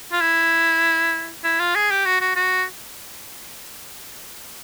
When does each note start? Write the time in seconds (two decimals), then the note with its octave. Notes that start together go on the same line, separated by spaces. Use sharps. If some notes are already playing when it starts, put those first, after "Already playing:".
0.12 F4
0.21 E4
1.44 E4
1.60 F4
1.75 G#4
1.91 G4
2.05 F#4
2.21 F#4
2.36 F#4